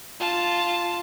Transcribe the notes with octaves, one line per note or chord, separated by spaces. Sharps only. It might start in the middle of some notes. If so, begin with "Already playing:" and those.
F4 A5